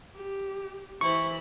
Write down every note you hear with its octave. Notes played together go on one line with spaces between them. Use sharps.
G4
E3 E4 C5 B5 C#6